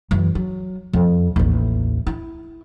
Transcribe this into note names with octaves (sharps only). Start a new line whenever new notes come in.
F#2 E3
F#3
F2
A1 D#2
E4